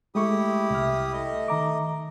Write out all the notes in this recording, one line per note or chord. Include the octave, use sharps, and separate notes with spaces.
G#3 A3 E4 G4 C#6 D#6
C2 E5 F6
A3 D#5
D#3 A#5 D6